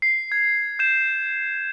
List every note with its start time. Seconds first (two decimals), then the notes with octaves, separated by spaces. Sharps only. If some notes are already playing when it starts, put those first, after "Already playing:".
0.02 C7
0.32 G#6
0.79 G6 E7